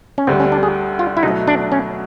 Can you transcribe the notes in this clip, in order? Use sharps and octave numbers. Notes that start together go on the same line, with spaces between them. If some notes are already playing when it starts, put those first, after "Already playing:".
C#4
D2 D3 G3 C4
C#4
D4
G#4
F4
E4
B2 F#3 A3 D#4
D4
C#4